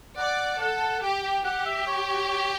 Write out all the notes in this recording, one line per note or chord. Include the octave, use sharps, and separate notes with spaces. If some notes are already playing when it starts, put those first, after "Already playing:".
D5 F#5
A4 F#5
G4 G5
G5
G4 F#5
E5
C#5
C#5
C#5